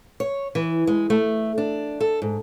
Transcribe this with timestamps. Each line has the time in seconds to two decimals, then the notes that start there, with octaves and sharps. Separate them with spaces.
0.20 C#5
0.55 E3
0.87 G#3
1.10 A3
1.58 D4
2.00 A4
2.22 G#2